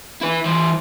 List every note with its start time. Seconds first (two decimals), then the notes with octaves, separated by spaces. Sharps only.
0.22 E4 B4
0.45 E3 C5